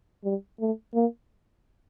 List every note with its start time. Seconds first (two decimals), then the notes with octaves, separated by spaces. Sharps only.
0.24 G3
0.60 A3
0.95 A#3